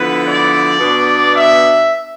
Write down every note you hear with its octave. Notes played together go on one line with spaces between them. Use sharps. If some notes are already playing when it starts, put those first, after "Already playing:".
Already playing: D3 F3 B3 E4 B4
D5
B2 B3 D4
E5